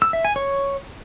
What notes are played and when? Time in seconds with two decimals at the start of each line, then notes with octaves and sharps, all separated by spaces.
0.02 E6
0.13 E5
0.25 G#5
0.36 C#5